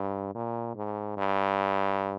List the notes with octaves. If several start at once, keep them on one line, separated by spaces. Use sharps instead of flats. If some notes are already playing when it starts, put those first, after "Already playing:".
Already playing: G2
A#2
G#2
G2